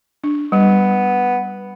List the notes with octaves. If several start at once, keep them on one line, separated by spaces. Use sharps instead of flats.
D4
G3 B3